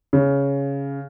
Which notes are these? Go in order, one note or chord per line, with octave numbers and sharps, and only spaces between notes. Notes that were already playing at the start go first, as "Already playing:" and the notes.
C#3